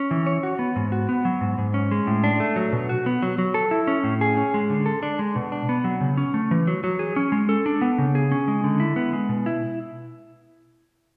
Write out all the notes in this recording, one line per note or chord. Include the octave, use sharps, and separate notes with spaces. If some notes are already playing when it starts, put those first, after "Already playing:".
Already playing: C#4
E3
C#5
F#4
B3
G#2
F#4
B3
F#3
G#2
G#2
C#4
G#3
A2
D4
A3
F#3
B2
F#4
B3
F#3
F#3
A4
E4
C#4
A2
G#4
C#4
G#3
D3
A4
D4
G#3
B2
D4
B3
F#3
C#3
C#4
A3
E3
F#3
F#3
G#4
C#4
G#3
A4
D4
B3
C#3
G#4
C#4
G#3
D3
E4
B3
G#3
B2
E4